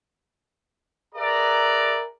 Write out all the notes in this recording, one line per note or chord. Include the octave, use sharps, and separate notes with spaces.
G#4 A#4 B4 D5 E5 A#5